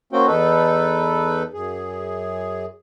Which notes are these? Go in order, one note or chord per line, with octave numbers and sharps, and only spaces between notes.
A#3 C4 C#4 F#4 G5
E2 D#4 A4 B4
F#2 G#4